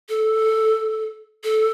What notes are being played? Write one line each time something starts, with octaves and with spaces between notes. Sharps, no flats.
A4
A4